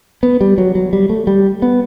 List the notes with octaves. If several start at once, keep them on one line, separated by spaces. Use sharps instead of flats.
B3
G3
F#3
F#3
G3
A3
G3
B3